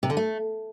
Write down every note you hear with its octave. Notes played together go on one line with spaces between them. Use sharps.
C3
D3
A3